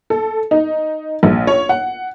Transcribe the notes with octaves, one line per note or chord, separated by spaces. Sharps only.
A4
D#4
A#1
C#5
F#5